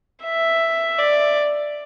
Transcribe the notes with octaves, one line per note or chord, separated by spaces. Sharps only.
E5
D5